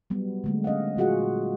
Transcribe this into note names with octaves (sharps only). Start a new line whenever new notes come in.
F#3 G3 B3
D3 G#3 A3
C#4 D#5 F5 F#5
A#2 F#3 F4 F#4 G#4 F#5